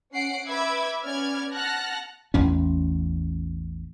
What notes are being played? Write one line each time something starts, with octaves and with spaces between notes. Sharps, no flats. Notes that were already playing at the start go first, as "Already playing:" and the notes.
C#4 F#5 C7 D7
B4 E5 B5 D6 E6 G#6
B3 C#4 D5 F6 G#6
F#5 A5 F6 F#6 A#6
A1 E2 C#4